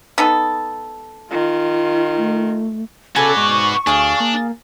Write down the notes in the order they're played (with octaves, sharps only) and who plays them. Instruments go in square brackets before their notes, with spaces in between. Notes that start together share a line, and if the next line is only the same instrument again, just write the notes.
[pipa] B3 D#4 A4
[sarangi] D#3 [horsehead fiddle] F4
[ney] A3
[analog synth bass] C#3 [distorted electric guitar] F#4 B4 [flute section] A4 [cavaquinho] D5 G#5
[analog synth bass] G#2 [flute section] C#6
[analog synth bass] D2 [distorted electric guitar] D4 [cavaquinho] G#4 F5
[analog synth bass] A#3